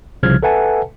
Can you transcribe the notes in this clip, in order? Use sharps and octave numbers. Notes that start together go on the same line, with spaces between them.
C2 C#3 F3 F6 G#6
A4 B4 E5 F#5 G#5 A5